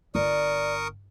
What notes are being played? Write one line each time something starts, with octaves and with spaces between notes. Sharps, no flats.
G1 A#4 D5 C#6 D#6